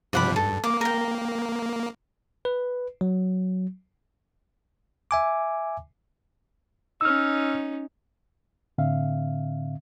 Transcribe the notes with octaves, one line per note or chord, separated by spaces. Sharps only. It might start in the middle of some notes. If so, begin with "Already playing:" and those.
G2 C3 F3 D5 F#5 B5
G2 A4
A#3 D6
A#4 G5
B4
F#3
E5 G#5 D6
C#4 D#4 E6 F6
A2 D3 C4 E5 F5